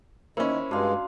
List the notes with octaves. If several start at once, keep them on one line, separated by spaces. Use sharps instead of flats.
D#3 A#3 C#4 E4 C5 B5
G2 G#3 D4 F#4 F5 C6